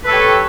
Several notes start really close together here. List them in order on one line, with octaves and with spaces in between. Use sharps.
B4 A4 C#5 G4